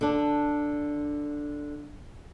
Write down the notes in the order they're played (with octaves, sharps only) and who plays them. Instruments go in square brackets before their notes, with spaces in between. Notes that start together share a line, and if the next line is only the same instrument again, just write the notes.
[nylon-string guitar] D3 D4